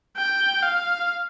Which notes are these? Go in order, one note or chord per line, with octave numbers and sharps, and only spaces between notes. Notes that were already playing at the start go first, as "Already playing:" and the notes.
G5
F5